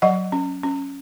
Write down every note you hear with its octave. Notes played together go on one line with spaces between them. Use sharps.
F#3 D#5 F#5
C#4
C#4